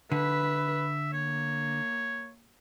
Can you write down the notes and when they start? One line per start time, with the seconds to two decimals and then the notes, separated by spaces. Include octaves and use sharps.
0.12 D3 B4 E5
1.13 A#3 C#5